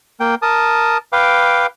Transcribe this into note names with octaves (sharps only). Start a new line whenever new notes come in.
A#3 G5
A#4 A5 D#6
B4 F5 G5 D6